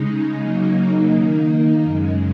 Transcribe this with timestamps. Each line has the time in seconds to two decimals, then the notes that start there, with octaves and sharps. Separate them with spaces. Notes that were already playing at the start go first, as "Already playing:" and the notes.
Already playing: C#3 G#3 D#4
0.40 C#3 F#3 A#3 D#4
1.11 D#3 A#3 D#4
1.83 F#2 C#3 G#3